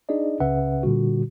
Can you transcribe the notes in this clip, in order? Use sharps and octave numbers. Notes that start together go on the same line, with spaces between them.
D4 D#4 G#4 D5 D#5
C#2 C#3 C#4 B4 E5 F#5
A#2 D3 G3 F#4